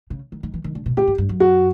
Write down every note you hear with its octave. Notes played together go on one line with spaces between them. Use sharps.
C#3
D#3
D#3
E3
D#3
D3
B2
A2 G4
G#2
G2
F#2
F#4